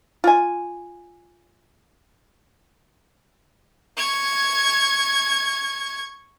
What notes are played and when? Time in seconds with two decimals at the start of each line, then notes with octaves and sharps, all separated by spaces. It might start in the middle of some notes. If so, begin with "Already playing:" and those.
0.24 F4 G#5
3.98 C#6 G#6